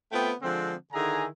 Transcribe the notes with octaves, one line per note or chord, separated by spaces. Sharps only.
A3 B3 C4 F4 G5
D3 F3 G#3 C4
D3 D#3 E4 G#4 G#5 A#5